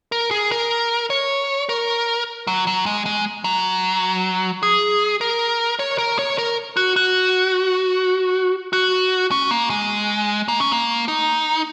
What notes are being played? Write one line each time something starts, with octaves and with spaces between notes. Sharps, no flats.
A#4
G#4
A#4
C#5
A#4
F#3
F#3
G#3
G#3
F#3
G#4
A#4
C#5
A#4
C#5
A#4
F#4
F#4
F#4
C#4
A#3
G#3
A#3
C#4
A#3
D#4